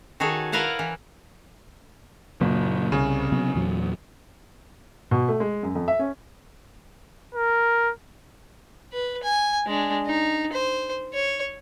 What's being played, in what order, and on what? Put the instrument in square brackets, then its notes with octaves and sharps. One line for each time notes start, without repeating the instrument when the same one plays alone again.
[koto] D#3 F#4 G#4 A4 C#5
E4 A#4 B4 F5 F#5 A5
E3
[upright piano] F#1 [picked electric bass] A#2 F#3
[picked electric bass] C2 [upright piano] C#3
[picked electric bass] C3 F#3 B3
E2 A#2 F#3
[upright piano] B2
A3
G#3
F#2
F2
E5
C#4
[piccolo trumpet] A#4
[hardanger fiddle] B4
G#5
G#3 D4
D#4
C5
C#5